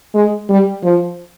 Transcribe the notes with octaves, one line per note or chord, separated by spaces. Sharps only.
G#3
G3
F3